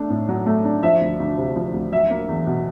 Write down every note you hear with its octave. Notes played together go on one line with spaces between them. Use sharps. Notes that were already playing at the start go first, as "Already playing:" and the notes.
Already playing: A3 D4
A2
F#3
A3
D4
F3 E5
D2
D2
C3
F3
D2
F#3 E5
A#3
E2
B2